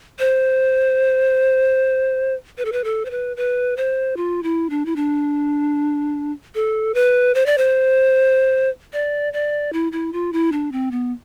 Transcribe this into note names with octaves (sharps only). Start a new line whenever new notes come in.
C5
B4
A4
B4
A4
C5
B4
B4
C5
F4
E4
D4
E4
D4
A4
B4
C5
D5
C5
D5
D5
E4
E4
F4
E4
D4
C4
B3